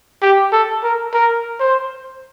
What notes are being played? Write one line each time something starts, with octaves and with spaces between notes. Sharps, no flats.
G4
A4
A#4
A#4
C5